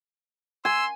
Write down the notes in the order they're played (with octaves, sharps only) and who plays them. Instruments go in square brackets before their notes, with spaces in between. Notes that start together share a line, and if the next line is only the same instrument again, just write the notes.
[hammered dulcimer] G#5 [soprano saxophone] C6 [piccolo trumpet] E6